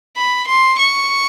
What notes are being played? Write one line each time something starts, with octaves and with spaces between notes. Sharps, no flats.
B5
C6
C#6